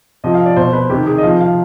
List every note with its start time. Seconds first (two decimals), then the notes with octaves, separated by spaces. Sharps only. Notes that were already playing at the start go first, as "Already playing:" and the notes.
0.24 C3 F3 D#5
0.34 F5
0.46 D5
0.56 B2 C5
0.73 B4
0.90 C3 G4
0.95 D#3
1.07 G#4
1.18 D#5
1.23 C3 F3 F5
1.41 F5